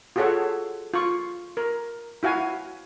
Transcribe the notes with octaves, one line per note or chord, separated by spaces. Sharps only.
F4 F#4 G#4 A4 C#5 F#5
F4 C#6
A#4
E4 F#4 F5 G#5